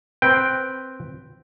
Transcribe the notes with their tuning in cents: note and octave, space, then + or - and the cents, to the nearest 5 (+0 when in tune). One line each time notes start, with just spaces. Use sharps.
C4 +0 B4 +0 G5 +0